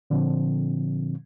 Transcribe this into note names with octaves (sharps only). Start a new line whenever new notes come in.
A#2 D3 F3 C4